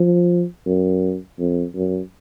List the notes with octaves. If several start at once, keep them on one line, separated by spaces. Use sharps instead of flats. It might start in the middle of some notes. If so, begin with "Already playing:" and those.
Already playing: F3
F#2
F2
F#2